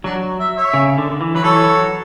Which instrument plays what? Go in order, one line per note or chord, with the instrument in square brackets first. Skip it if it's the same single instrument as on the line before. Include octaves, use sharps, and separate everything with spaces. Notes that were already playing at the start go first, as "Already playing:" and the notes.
[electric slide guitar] F#3 [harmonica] D4 F#4
[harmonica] E5
C#5 E5
[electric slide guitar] C#3
D3
D3
E3
[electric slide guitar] F#3 [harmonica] B4
[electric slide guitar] E3 [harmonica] A4 C#5
[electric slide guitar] F#3